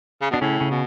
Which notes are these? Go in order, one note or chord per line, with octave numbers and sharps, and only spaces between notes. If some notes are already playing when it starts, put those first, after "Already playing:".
C#3
B2 D4
A2 C#3 C#4
C#3 C#4
B2